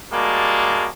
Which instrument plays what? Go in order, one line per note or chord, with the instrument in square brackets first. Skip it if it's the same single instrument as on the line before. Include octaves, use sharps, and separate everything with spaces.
[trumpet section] G3 G#3 A#3 F#4 A5